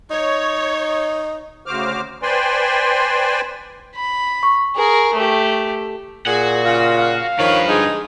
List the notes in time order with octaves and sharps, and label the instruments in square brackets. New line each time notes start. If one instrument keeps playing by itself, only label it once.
[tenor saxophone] D#4 [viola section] C#5
[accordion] D2 C#3 F#4 C5 D6 F6
B4 C5 D5 G5 G#5 C6
[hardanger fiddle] B5
[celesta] C#6
[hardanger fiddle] G#4 A#4
A3 G4
[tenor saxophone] A#2 [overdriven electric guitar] F#4 F#5 [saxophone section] G#4
[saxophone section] C#3 F4
[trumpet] F5
[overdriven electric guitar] G2 B4 [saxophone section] D#3 A#4 C#5 [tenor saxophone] F3
[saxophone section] D3 G#3 D#4 [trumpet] G#4